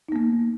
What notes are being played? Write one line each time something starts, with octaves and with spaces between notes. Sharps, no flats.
A#3 B3 D#4